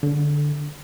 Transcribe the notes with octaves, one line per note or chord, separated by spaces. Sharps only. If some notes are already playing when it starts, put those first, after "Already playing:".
D3